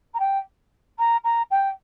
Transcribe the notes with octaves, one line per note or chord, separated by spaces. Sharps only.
A#5
G5
A#5
A#5
G5